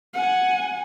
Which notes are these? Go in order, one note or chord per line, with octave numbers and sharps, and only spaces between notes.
F#5 G#5